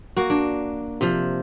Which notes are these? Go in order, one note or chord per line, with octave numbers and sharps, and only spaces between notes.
A#3 F#4
D4
C3 F3